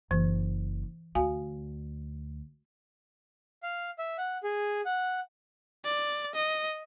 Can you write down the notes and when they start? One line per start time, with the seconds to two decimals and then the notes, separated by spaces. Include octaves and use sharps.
0.11 F#1 E3
1.15 D2 F#4 F5 G#5
3.63 F5
3.99 E5
4.18 F#5
4.43 G#4
4.85 F#5
5.85 D5
6.35 D#5